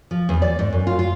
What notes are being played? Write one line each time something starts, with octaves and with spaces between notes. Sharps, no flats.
F3
E2
D5
G#2
F#2
F4
F4